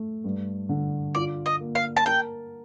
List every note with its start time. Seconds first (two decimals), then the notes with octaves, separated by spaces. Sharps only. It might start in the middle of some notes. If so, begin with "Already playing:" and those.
Already playing: A3
0.24 G2
0.69 D3
1.15 F4 D5
1.46 D#5
1.60 A#3
1.75 F5
1.97 A5
2.06 A#4 G5